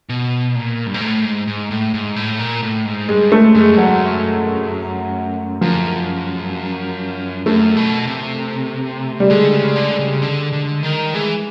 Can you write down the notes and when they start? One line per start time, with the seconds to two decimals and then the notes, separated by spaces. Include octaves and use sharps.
0.09 B2
0.55 A#2
0.86 G2
0.94 G#2
1.01 A2
1.24 G#2
1.47 G#2
1.71 A2
1.94 G#2
2.16 A2
2.39 A#2
2.63 A2
2.85 G#2
3.08 G2 G#3
3.32 A3
3.55 F#2 G#3
3.72 G2
3.77 F#2 F#3
5.61 F#2 F3
7.46 F#2 A3
7.77 B2
8.07 C3
9.20 G3
9.30 D3 G#3
9.53 C#3
9.76 D3
9.99 C#3
10.22 D3
10.53 D3
10.83 D#3
11.14 E3 G#3